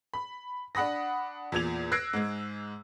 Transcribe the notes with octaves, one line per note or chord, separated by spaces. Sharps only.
B5
D4 F#5 B5 D#6 A#6
E2 A#2 G#6 F7
E6 F#6 G#6 A#6 C7 D7
G#2 G#3